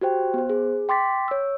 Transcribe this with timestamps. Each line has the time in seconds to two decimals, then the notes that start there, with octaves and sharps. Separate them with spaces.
0.01 F#4 G4 C5 G5
0.34 B3 C5
0.50 G#4
0.89 G5 C6 D6 A6 B6
1.28 C#5 E6